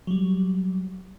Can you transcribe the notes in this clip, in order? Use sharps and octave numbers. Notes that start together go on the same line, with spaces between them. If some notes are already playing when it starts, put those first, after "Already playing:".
F#3 G3